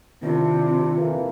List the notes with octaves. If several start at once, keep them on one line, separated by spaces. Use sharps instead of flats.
C3 D#3 C4 D4 E4 F4
F2 E3 A#3